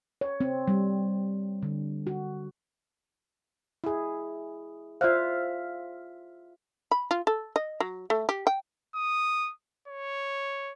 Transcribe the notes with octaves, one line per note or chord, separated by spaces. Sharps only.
C#5
C4
G3
D3
F#4
E4 G#4
F4 C5 D5 E5 F5
B5
F4
A4
D#5
F#3
A3
G4
G5
D#6
C#5